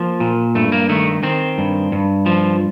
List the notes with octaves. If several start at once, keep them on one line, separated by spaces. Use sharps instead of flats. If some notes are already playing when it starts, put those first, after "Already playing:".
Already playing: F3 A#3
A#2
G2 A3
A#3
D#3 A3
D#3 C4
G2
G2
F3